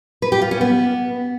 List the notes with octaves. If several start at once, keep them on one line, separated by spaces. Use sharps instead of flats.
B4
G4
F4
C#4
B3